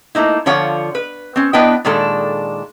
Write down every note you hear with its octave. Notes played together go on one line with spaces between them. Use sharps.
A3 A#3 D#4 E4
D3 F3 F4 C#5 F#5
B4
C4 C#4
B3 D4 E4 B4 D#5 G5
A#2 D#3 G#3 D4 A4